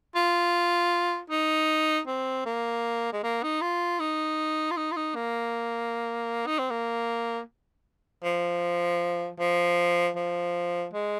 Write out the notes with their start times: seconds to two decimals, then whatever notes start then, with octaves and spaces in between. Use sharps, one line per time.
0.15 F4
1.30 D#4
2.07 C4
2.45 A#3
3.13 G#3
3.23 A#3
3.43 D#4
3.61 F4
4.00 D#4
4.71 F4
4.77 D#4
4.92 F4
4.96 D#4
5.15 A#3
6.46 D#4
6.59 C4
6.70 A#3
8.24 F3
9.40 F3
10.16 F3
10.93 G#3